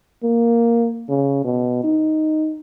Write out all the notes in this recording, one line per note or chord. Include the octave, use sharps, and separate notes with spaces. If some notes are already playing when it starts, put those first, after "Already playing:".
A#3
C#3
B2
D#4